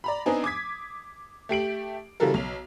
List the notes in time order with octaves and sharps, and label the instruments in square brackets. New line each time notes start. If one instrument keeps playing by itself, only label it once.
[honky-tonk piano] D5 A#5 B5
B3 C4 D4 D#4 G#5
D6 D#6 G#6 B6
A3 G4 D7 F#7
C#3 E3 G3 F#4 A4 A#4
B1 F7